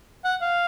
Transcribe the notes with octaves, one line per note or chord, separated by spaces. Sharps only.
F#5
F5